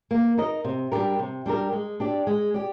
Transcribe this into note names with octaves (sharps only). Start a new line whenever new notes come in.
A#3
D#4 A#4 D#5
C3
G3 D4 G4 A#4
C3
G3 D4 G4 A#4
G#3
D4 G4 D5
G#3
G4 D5